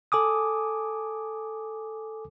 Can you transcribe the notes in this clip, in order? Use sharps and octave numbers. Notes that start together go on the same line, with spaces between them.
A4 G#5 D6 D#6